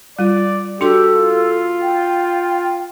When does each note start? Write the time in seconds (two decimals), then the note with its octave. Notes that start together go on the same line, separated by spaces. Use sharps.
0.19 G3 F4 D5
0.81 D4 F#4 G4 A4 C6
1.11 F4
1.82 G5